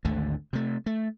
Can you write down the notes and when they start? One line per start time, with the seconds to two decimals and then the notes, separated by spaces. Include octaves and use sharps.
0.05 G#1 D2 D3 A3
0.53 C3 A3
0.86 A3